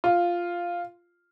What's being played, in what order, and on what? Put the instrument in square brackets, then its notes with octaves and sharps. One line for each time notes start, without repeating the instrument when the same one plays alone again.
[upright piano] F4